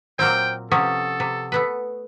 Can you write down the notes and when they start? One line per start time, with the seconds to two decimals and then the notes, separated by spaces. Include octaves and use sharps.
0.19 A#2 F#3 C4 C5 G5 F6
0.72 C3 F3 C#4 A4 F#5 C#6 D#6
1.20 C3
1.52 A3 B3 B4